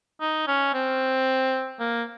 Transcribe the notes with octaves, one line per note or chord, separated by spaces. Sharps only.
D#4
C#4
C4
A#3